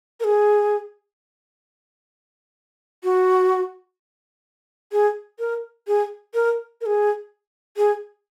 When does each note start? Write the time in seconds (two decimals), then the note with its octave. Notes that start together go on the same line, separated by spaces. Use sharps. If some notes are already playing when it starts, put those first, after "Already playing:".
0.20 A#4
0.24 G#4
3.04 F#4
4.92 G#4
5.39 A#4
5.87 G#4
6.34 A#4
6.81 A#4
6.86 G#4
7.77 G#4